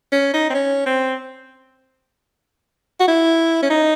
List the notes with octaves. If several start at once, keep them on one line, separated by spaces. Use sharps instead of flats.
C#4
D#4
C4
C#4
C4
F#4
E4
C#4
D#4